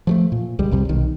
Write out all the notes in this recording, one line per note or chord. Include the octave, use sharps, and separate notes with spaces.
F3 F#3 A3
A#2
C#2 G3 G#3
F1 C2 C3 G3
B1 D#3